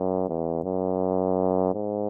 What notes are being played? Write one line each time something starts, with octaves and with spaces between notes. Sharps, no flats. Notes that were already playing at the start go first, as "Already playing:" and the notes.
Already playing: F#2
E2
F#2
G#2